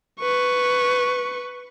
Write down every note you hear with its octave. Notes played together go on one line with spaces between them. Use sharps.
B4 C#6